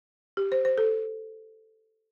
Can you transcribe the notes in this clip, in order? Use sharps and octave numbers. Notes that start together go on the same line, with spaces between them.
G4
C5
C5
A4